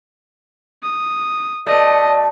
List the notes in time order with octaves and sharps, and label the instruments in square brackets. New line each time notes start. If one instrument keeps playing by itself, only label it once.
[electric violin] D#6
[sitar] B2 A3 [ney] D5 [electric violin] D#5